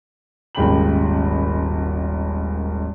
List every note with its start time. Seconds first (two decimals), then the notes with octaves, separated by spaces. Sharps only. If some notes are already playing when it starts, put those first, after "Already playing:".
0.55 D#1 G#1 C#3 G5 B5 F#7